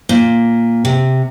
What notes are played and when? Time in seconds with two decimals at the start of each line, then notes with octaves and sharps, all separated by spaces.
0.09 A#2
0.85 C3